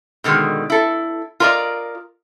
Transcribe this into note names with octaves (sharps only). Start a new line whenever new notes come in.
B2 D3 D#3 G#3
E4 A4
F4 A#4 C5 D5 D#5